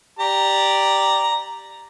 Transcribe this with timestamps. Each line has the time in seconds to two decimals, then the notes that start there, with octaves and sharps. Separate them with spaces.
0.19 G4 D5 A#5